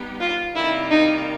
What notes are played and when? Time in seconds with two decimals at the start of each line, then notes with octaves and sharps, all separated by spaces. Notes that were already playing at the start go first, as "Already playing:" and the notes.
Already playing: G3 B3 D#4 G4
0.20 F4
0.55 C3 D#3 G3 A#3 E4
0.91 D#4